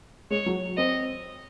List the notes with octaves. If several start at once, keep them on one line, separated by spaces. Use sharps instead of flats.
G#3 C#5
F#3
C4 D#5